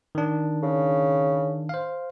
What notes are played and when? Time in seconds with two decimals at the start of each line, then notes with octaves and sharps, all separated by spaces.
0.15 D#3 D4
0.62 C#3
1.69 C5 F5